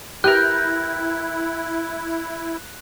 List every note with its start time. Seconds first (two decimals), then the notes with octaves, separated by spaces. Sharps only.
0.24 E4 G4 A#4 B4 G5 F#6